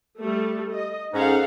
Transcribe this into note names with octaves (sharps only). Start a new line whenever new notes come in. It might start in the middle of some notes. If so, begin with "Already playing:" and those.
G3 A3 A4
D#5
G#2 C#4 D#4 A4 F5 F#5